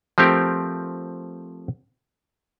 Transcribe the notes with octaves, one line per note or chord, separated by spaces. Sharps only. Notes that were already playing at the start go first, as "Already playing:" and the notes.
F3 A3 C4 G4 A#4